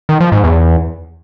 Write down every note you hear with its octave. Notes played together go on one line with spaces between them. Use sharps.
D#3
F3
G#2
E2